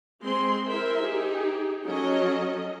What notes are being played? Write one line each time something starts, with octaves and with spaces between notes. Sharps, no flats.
G#3 C4 G#4 C6
E4 A#4 C5 E5
D#4 G4 G#4
F#3 C#4 A4 D#5